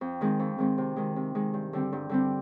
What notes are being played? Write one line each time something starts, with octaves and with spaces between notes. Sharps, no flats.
F2
D#3 G#3 C4
F2
D#3 G#3 C4
C3
D#3 G#3
C3
D#3 G#3
G2
D3 G3 C4
G2
D3 G3 C4